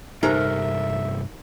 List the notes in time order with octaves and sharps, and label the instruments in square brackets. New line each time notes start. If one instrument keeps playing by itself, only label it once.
[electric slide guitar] G2 C3 A4 [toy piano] D#4 G4 C5 [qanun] A#4 [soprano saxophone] E5